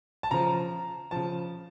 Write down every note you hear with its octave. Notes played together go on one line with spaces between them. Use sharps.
A5
C#3 F3 A#5
C#3 F3 A5